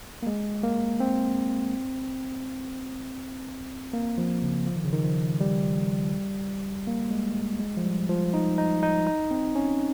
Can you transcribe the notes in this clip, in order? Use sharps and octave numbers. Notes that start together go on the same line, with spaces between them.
A#3
G#3
A#3
C4
A#3
F3
C#3
F3
D#3
C#3
D#3
F3
G3
A#3
G#3
G#3
G#3
F3
G3
F3
D#4
D#4
D#4
D#4
C4
C#4